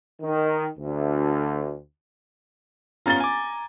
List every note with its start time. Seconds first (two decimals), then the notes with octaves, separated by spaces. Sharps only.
0.22 D#3
0.78 D2
3.06 B3 C#4 F4 A#5 A6 G7
3.20 G#5 D6